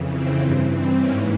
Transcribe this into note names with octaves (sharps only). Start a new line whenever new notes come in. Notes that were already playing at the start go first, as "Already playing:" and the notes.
Already playing: F2 C#3 E3
C4
G2 E3
C4
G#2 E3 A#3 C#4